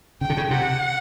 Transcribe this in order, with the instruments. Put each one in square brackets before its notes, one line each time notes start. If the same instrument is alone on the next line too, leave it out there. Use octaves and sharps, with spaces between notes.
[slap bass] C#3 [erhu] G5
[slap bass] D3
C#3
[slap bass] C3 [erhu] F#5